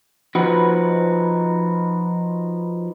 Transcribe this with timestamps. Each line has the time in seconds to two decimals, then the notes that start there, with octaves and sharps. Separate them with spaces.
0.35 F3 D#4 F#4 B4